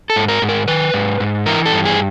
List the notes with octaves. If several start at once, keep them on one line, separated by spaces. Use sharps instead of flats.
A4
G#2
A#4
G#2
A#4
D#3 B4
G#2
G#2
E3 A#4
A4
G2
G#4